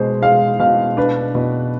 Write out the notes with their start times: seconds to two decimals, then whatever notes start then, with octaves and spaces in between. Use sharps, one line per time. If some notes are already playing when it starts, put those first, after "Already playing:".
Already playing: B2 G#3 G#4 C5
0.22 G#3 F5
0.59 B2 F5
0.97 D4 B4
1.35 B2